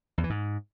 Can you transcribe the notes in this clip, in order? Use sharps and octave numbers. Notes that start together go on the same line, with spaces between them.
E2
E3
G#2